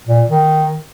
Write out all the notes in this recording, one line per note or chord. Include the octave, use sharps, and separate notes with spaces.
A#2
D#3